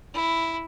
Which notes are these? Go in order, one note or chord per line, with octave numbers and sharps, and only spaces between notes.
E4